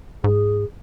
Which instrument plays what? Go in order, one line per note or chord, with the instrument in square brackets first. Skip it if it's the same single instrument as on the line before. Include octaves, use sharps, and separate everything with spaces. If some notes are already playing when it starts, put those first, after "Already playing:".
[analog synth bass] G#2 [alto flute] G#4